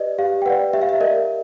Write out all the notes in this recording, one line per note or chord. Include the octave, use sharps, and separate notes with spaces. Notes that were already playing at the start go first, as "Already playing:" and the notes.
Already playing: G4 B4 D5 D#5
G4 F5
G5
B4 D5 F#5
G4 E5
F5
E5
A#4 D5 D#5